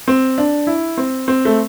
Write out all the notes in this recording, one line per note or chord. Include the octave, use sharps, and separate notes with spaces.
C4
D4
E4
C4
C4
A3